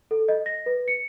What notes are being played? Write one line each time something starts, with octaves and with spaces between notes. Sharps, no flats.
A4
D#5
A#6
B4
C#7